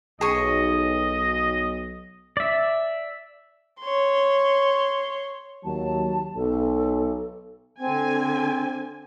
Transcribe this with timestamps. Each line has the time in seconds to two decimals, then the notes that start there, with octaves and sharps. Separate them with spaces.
0.21 B1 G#4 D#5 C#6
2.37 D5 E5
3.81 C#5 C6
5.65 D#2 F#3 A5
6.35 B1 A4
7.80 D3 C4 G#5